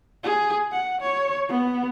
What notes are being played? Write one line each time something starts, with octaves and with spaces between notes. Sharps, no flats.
G#4
F#5
C#5
B3